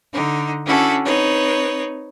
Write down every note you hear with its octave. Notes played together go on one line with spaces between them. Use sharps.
D3 D#4
C#4 D4 E4 F#4 A4
C4 D#4 B4 C#5